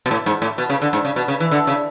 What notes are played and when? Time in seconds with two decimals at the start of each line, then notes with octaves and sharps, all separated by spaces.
0.06 B2
0.11 A2
0.26 G#2
0.42 A2
0.58 B2
0.70 C#3
0.82 D3
0.93 G#2
1.05 C#3
1.16 B2
1.28 C#3
1.40 E3
1.51 D3
1.67 C#3